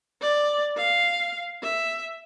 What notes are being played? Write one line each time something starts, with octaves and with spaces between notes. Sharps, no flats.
D5
F5
E5